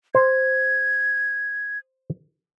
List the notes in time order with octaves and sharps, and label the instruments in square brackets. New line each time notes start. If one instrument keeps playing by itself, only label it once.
[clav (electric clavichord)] C5 [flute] G#6